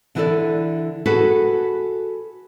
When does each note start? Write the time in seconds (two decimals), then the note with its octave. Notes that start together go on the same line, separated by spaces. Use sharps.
0.15 D3 E3 E4 G#4 A4 D5
1.06 F#4 G#4 A4 B4